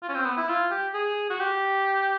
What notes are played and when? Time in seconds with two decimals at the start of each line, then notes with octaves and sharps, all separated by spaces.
0.03 F4
0.09 C#4
0.14 C4
0.26 B3
0.37 E4
0.49 F4
0.71 G4
0.94 G#4
1.30 F#4
1.40 G4